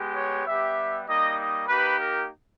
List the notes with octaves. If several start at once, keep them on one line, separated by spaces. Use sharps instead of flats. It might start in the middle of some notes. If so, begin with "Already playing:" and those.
Already playing: G#3 B3 G4
C#5
G3 B3 G4 E5
G3 A#3 D#4 D#5
D#5
A#3 D#4 G4 B4
A#4